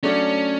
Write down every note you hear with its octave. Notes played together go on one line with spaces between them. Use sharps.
F#3 A3 C#4 D4